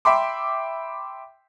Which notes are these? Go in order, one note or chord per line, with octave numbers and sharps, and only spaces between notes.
E5 G5 B5 C6 D6